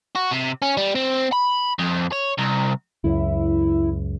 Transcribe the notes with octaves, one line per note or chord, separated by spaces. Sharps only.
F#4
C3
C#4
G3
C4
B5
F2
C#5
C2
C#2 F#2 E4